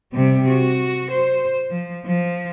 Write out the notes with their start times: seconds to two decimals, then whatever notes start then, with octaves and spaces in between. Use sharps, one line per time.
0.12 C3 G3
0.48 F#4
1.11 C5
1.71 F3
2.06 F3